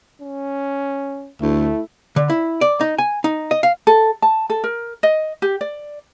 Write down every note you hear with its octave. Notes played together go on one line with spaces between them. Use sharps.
C#4
D2 A3 E4
D3
E4
D5
D#4
G#5
D#4
D#5
F5
A4
A5
A4
A#4
D#5
G4
D5